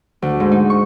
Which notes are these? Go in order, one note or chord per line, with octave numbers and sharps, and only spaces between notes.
D2
G#2
D#4
C#6